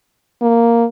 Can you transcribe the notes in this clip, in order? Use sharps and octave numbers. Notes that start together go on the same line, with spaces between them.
A#3